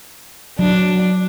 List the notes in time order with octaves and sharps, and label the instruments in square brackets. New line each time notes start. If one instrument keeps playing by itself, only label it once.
[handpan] F#3 [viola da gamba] D4